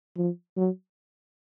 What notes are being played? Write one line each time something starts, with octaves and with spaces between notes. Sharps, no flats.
F3
F#3